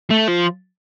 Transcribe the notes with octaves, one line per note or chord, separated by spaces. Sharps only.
A3
F3